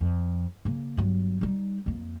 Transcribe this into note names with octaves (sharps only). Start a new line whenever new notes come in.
F2
C#3 A#3
G1 F#3
G3 D#4
F2 A#3